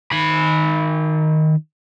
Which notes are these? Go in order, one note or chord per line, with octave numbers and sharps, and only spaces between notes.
D#3 B5